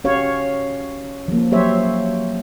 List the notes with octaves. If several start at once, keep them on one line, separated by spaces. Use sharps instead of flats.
C#4 F#4 G4 C#5 F5
F3 A#3
F#3 G4 C5 C#5 E5